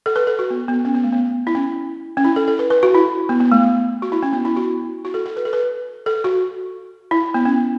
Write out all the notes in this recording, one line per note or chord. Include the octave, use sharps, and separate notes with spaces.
A4
B4
A4
F#4
B3
B3
C#4
B3
A3
B3
E4
C#4
C#4
E4
A4
A4
B4
B4
F#4
E4
B3
B3
A3
F#4
E4
C#4
B3
E4
F#4
F#4
A4
A4
B4
A4
B4
A4
F#4
E4
B3
C#4